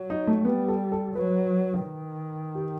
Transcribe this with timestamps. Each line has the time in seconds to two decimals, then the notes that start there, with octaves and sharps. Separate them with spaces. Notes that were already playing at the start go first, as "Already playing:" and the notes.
Already playing: F#3
0.10 D#4
0.27 A3
0.45 G3 B3
0.68 A4
0.92 A4
1.15 F#3 B4
1.85 D#3
2.55 G4